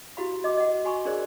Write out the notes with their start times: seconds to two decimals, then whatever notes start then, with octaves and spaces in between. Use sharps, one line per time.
0.17 E4 F#4 G4 F5 B5
0.43 F#4 D#5 D6
0.57 D#5 F#5
0.85 F#4 G#5 B5 C#6
1.05 D4 G#4 A#4 C5 D5